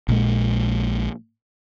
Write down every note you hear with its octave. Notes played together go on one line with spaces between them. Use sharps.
A#1 A#2 G#3